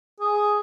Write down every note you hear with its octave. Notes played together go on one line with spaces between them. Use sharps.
G#4